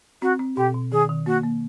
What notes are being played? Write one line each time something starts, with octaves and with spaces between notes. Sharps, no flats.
C4 F#4
C4
B2 G4
B2
D#3 G#4
D#3
A#3 F#4
A#3